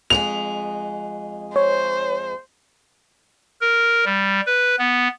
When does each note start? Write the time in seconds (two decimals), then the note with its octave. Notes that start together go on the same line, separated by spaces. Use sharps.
0.10 F2 G#3 G#4 F7
1.56 C5 C#5
3.61 A#4
4.05 G3
4.46 B4
4.79 B3